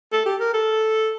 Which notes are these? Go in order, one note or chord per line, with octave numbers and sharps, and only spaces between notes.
A4
G4
A#4
A4